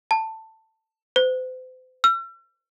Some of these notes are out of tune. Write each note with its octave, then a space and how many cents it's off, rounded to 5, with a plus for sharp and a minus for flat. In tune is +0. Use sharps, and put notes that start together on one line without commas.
A5 +15
C5 -40
E6 +45